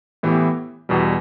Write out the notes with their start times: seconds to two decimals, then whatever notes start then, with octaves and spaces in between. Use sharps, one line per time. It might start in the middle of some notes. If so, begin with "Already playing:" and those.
0.23 A2 E3 B3 E4 G4
0.89 E2 B2 G3